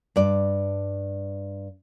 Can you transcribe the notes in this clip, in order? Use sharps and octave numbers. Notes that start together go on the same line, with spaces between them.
G2 D5